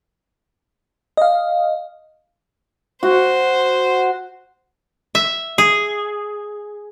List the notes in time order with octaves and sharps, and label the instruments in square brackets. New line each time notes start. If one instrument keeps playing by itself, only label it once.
[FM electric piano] D#5 F5
[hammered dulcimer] F#4 [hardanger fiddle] C5
[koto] E5
G#4